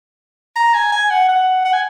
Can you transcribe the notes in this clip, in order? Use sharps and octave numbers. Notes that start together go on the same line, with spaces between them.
A#5
G#5
G#5
F#5
F#5
F#5
G#5